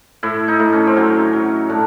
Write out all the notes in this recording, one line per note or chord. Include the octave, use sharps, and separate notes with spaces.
A2 E4
D#4
A2
C#4
C4
F#3 C#4
F#3
A2 D4